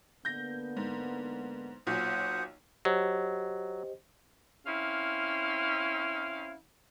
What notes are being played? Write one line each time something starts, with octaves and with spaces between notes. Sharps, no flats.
D3 A#3 B3 G6 A#6
G#2
B1 A#2 F#3 C5 F#5 D#6
F#3 G4 C5 D#5
C4 C#4 E4 F5